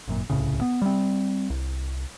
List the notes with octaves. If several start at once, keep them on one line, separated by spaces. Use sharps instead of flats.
G#1 F#2 A#2
D1 C2 A2 C#3
B3
G3 G#3 C4
C2